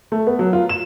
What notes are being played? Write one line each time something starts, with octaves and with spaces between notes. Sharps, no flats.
A3
B3
F#3
F4
E7